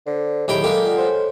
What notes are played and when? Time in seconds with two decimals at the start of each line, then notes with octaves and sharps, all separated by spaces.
0.07 D3 C5
0.48 D#2 A2 F#3 G4 G#4 B5 D6
0.64 G#3 A#3 G4 A4
0.82 F4 D5 F#5
0.98 C5 C#5